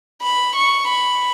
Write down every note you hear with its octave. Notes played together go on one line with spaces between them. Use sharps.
B5
C#6
B5